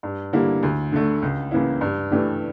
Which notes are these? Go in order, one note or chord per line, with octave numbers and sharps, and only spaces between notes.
G2
D3 G3 A#3 E4
D2
D3 A3
C#2
C#3 E3 A#3 E4
G2
E3 A3 D4 G4